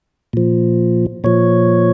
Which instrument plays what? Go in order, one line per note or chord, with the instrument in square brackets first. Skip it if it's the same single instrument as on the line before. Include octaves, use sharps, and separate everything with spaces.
[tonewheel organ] A#2 F3
A#2 F3 C#5